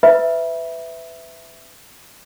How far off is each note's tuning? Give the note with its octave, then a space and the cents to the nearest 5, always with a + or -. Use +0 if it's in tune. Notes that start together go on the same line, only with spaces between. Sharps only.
B4 +30 E5 +0 B5 -30